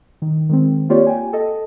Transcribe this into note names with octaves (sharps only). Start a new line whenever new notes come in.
D#3
D#3 G#3 C4
A#3 C4 F4 G4 C#5 D5
G5 G#5
A4 D#5